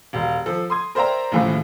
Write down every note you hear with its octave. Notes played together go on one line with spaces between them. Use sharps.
E1 G4
F3 A4
C6 D#6 G#6
A#4 C5 D5 E5 G5 A#5
D#2 A2 C#3 E3 F3 A3